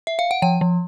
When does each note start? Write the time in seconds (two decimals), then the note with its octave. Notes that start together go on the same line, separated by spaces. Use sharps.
0.07 E5
0.19 F5
0.31 F#5
0.42 F3 G5
0.61 F3